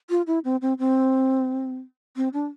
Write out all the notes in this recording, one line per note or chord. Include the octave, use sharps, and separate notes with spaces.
F4
E4
C4
C4
C4
C4
D4